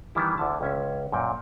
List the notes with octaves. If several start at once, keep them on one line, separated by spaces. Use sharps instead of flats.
D#3 E3 G3 B3 E4
D2 D3 A5
C#2 C#4 E5
F#2 A#2 G5